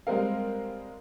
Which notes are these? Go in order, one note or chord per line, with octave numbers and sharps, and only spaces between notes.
G3 G#3 C4 A#4 F5